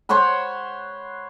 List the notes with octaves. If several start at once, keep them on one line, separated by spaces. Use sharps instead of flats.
C5 C#5 F#5 B5